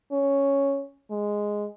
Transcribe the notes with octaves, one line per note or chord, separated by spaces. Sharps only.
C#4
G#3